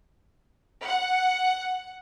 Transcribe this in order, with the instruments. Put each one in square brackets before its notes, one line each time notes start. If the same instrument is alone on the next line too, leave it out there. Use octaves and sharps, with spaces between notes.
[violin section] F#5